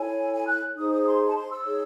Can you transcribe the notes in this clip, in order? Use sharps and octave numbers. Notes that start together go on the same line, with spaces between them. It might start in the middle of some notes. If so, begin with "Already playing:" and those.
Already playing: E4 A4 C#5 G#5
G#5
F#6
D#4 G#4 C5 D#6
D#6
C6
A5
C6
E6
D#4 G#4 C#5